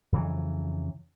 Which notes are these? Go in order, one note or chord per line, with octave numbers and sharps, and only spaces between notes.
F2 C#3 E3 F#3